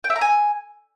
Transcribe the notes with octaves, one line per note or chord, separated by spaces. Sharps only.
G5
E5
A#5
G#5